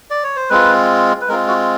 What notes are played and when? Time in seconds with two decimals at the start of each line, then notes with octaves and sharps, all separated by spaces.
0.10 D5
0.23 C#5
0.36 C5
0.50 G#3 C4 F4 B4
1.21 B4
1.28 G#3 C4 F4 A#4
1.48 F#4